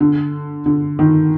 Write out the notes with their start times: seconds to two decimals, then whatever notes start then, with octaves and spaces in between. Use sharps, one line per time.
0.01 D3
0.66 D3
0.99 D#3